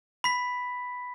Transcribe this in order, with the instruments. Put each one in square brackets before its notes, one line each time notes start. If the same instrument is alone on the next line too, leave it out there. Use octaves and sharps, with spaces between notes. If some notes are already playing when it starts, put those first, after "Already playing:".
[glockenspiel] B5 B6